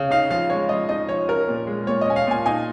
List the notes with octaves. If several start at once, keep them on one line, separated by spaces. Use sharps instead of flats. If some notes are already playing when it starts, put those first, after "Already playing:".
Already playing: C#3
D#4 F5
F3 F5
G#3 C#5
F3 D#5
D#4 D#5
F3 C#5
C#4 A#4
A#2
G#3
A#2 C#5
D#5
C#4 G#5
F5
A#2 G#5
D#4 G#5